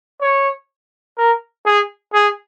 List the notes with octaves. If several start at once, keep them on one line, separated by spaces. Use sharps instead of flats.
C#5
A#4
G#4
G#4